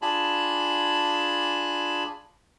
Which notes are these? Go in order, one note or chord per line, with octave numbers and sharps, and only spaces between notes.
D4 F4 G#4 G#5 A5 B5